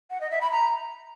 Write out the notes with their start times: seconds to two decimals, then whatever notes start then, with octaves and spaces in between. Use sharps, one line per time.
0.10 F#5
0.21 D#5
0.31 E5
0.41 B5
0.52 A#5